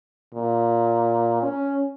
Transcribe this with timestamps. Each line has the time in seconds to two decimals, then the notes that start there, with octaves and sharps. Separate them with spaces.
0.34 A#2
1.43 C#4